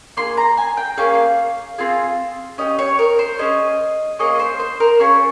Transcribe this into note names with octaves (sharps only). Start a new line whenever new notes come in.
A#3 F4 G#4 C6
A#5
G#5
G5
A#3 C#4 G#4 F5
C4 F4 G#4
C#4 G4 D#5
C#5
A#4
C5
C#4 G#4 D#5
A#3 C#4 G#4 D#5
C5
C5
A#4
C#4 F4 G#4 C#5